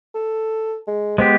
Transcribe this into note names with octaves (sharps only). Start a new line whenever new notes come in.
A4
G#3
G#3 B3 G4 C5